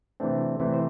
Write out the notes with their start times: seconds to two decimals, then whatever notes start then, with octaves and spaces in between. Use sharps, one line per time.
0.20 C3 E3 A3 C4 D4
0.60 C3 E3 A3 C4 E4
0.74 C5